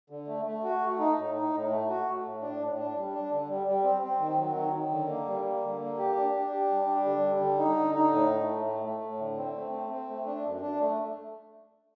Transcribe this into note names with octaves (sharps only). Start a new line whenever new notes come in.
D3
A3
A3
F#4
A3
D#4
A2
D#4
A2
A3
F#4
A3
A2
D4
A2
D4
G3
D4
D3
G3
G3
C4
C4
D#3
F#3
D#3
D#3
D3
A#3
G3
A#3
D3
A#3
G4
D4
D4
G4
G3
D4
D3
G3
D3
D#4
D3
D#4
A2
A3
A2
A3
A3
A2
D3
C4
A3
C4
C4
A3
D4
F#2
D4
A3